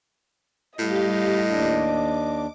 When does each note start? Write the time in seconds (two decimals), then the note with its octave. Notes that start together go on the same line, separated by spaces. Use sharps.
0.79 A2 G3 G4 D#5 F5
1.50 D#2 D4 D6